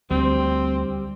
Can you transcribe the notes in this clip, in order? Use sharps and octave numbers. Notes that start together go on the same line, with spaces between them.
D2 G3 C4